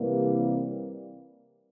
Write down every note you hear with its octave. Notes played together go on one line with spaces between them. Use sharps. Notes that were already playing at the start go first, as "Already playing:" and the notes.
Already playing: C3 E3 G3 A#3